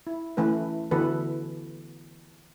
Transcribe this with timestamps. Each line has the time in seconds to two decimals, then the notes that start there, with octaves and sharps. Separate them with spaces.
0.07 E4
0.37 E3 A3 C#4 B4
0.91 D3 E3 B3 F#4 A4 B4